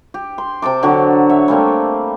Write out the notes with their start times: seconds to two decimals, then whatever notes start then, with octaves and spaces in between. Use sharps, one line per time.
0.14 G4
0.38 C6
0.62 C3 G5 A5 D6
0.83 D3 F#3 F#4
1.30 C#5 E5
1.48 G3 A3 A#3 C4